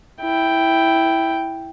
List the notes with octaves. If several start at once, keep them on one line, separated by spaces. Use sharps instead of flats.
E4 G5